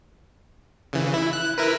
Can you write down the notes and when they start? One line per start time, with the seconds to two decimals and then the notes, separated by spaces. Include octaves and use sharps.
0.93 C#3 E3
1.14 E4
1.33 F#6
1.58 E4 A#4 B4